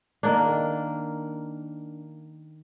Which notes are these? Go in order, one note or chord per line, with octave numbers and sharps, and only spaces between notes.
D#3 A#3 D4